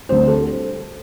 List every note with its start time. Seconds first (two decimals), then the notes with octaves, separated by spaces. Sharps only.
0.09 D2 D3 G3 C4 C5
0.28 A4